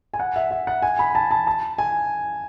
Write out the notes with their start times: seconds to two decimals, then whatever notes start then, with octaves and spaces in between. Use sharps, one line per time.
0.14 G#5
0.20 F#5
0.36 E5
0.51 E5
0.67 F#5
0.82 G#5
0.99 B5
1.15 A5
1.31 A5
1.47 A5
1.78 G#5